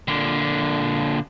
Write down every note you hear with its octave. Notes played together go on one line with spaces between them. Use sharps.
A#2 D3